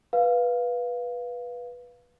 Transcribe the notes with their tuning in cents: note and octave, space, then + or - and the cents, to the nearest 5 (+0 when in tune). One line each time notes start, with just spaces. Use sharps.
B4 -10 F5 +0